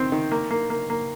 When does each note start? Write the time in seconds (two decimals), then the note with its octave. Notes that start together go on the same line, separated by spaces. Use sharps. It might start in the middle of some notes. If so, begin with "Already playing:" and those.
Already playing: D#3 C4
0.12 D#3
0.32 A#3
0.51 A#3
0.70 A#3
0.90 A#3